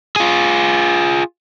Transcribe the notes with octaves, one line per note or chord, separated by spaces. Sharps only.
F4 G#4